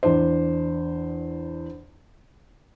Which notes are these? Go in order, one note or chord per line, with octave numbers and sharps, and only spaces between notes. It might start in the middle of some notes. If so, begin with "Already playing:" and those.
E2 D4 C5